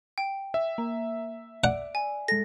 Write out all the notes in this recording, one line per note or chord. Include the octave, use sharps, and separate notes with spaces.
G5
E5
A#3
D5 F#5
G#5
G#3 A4 A#6